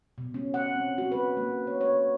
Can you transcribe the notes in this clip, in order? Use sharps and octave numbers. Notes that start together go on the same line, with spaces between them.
B2
C#4
F#5
C4
F#4
B4
A#3
C#5
C#5